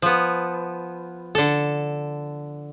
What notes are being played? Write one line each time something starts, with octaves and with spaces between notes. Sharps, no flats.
F3 B3
D3 A4